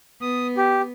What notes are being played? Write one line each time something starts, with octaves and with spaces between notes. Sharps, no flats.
B3 D#6
G4